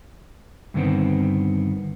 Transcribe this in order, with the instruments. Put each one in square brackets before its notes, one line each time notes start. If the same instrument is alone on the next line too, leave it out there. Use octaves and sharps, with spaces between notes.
[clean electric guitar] G2 D3 D#3 G#3 B3 C4